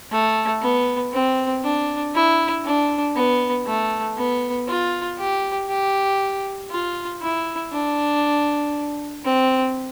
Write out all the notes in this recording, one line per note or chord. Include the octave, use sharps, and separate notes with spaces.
A3
B3
C4
D4
E4
D4
B3
A3
B3
F4
G4
G4
F4
E4
D4
C4